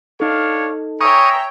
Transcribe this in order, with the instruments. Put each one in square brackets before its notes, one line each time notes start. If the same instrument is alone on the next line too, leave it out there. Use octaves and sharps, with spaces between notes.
[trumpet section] D4 C#5 F5 [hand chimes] D#4 A4
[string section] C#5 G5 [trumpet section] E5 G#5 A#5 [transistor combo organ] C#6 D#6